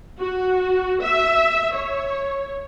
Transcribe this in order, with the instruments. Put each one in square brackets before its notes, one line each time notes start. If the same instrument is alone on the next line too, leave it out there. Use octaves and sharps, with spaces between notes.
[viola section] F#4
E5
C#5